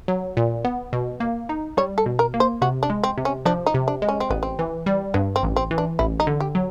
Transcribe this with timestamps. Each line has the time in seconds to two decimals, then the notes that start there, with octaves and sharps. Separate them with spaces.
0.08 F#3
0.37 A#2
0.65 B3
0.93 B2
1.20 A#3
1.49 D#4
1.77 G3 C#5
1.98 A4
2.06 B2
2.19 A#4
2.34 A#3
2.40 C5
2.62 C3 F#4
2.83 D4
2.90 G#3
3.03 C4
3.18 C3
3.25 C#4
3.45 F3 D4
3.66 D#4
3.74 C3
3.88 D4
4.02 G#3
4.09 C#4
4.20 C4
4.30 A1 B3
4.43 C4
4.59 E3
4.86 G3
5.14 G2 B3
5.36 C4
5.43 A1
5.56 C4
5.71 E3
5.78 D4
5.99 A1 E4
6.20 D#4
6.27 D3
6.40 G4
6.55 F#3